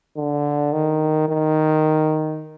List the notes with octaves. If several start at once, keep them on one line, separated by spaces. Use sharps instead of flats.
D3
D#3
D#3